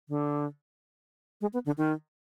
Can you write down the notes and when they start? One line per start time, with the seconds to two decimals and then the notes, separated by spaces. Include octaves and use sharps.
0.09 D3
1.41 G#3
1.53 B3
1.66 D3
1.78 D#3